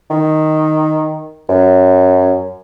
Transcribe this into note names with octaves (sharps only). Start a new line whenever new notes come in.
D#3
F#2